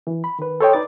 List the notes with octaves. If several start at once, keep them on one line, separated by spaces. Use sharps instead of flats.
E3
B5
D#3 B4
A4 C5 C#5 D#5 G5
D#4 B4 D5 D6 A6